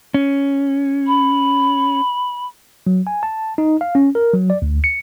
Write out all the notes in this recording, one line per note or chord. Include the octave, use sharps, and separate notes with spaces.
C#4
B5
F#3
G#5
A5
D#4
F5
C#4
A#4
F#3
D5
D2
C#7